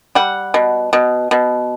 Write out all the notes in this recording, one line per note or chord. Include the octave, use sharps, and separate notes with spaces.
G3 F#5
B2
B2
B2